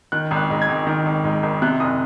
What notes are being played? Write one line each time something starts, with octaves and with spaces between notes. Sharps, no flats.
D#3 F#6
G#1
F#6
G#2
G#6
G#1
D#3
G#1
G#2
G#1
C3 F#6
F#1 D#6